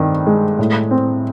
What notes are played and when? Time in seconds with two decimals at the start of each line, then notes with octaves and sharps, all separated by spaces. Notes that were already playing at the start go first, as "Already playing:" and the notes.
Already playing: G2 D#3 C4
0.27 G#3
0.59 A2
0.91 C4